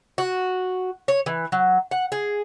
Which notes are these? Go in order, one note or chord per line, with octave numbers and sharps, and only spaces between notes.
F#4
C#5
E3
F#3
F#5
G#4